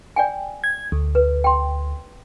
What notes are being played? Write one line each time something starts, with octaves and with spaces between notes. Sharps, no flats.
D5 G5 G#5
G#6
D2
B4
G5 C6